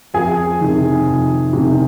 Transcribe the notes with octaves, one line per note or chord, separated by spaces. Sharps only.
F2 G#4 G#5
C3 D#3
F2
C3 D#3